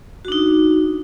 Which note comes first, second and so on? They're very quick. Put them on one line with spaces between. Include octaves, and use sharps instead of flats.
F#4 D4 D#4